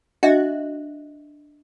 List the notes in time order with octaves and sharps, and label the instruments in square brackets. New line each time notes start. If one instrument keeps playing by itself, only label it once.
[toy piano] D4 D#5 E5 [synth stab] F#4